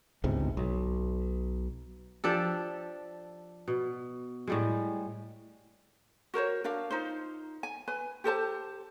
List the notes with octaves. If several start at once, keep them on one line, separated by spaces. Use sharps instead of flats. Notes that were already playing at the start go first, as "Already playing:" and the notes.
G1 C#2 G#2 C3
B1
F3 D4 G4 A4
B2
A2 G3 G#3
F#4 A#4 C5 C#5
D4 A#4 F5
D#4 F4 C5
G#5
B4 G#5
G4 A4 C5 A5